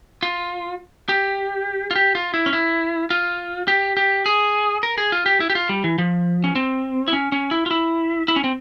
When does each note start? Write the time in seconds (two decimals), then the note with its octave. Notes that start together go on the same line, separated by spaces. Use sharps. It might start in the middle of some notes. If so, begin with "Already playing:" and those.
0.23 F4
1.09 G4
1.91 F4
1.96 G4
2.15 F4
2.34 E4
2.46 C#4
2.53 E4
3.10 F4
3.68 G4
3.97 G4
4.26 G#4
4.83 A#4
4.98 G#4
5.12 F4
5.26 G4
5.40 E4
5.50 G4
5.55 F4
5.69 G3
5.84 E3
5.98 F3
6.44 C#4
6.55 C4
7.08 E4
7.13 C#4
7.32 C#4
7.51 E4
7.66 F4
7.71 E4
8.28 E4
8.36 C#4
8.44 C4